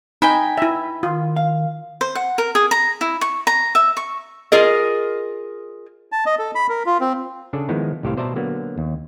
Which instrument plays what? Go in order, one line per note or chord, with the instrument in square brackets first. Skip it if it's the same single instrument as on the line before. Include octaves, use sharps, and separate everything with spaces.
[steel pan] D#4 [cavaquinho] G5 G#5 B5
[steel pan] E4 E5
[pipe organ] D#3 [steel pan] F4
[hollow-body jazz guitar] F5
[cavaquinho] C5
F#5
A#4
G#4
A#5
E4
C#6
A#5
E5
C#6
[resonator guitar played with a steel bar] F4 G#4 A#4 D#5
[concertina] A5
D#5
A4
B5
A#4
F4
C4
[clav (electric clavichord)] C#3 D4 G#4 A4 D5
D#3 F3 G#3 B3 D#4 E4
C2 A2 G4 A4 C5 F5
B2 C5 D5 E5 A5 A#5
D3 F#3 A#3 B3
D#2